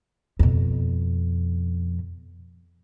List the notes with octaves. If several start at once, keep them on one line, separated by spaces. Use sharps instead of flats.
F2 B2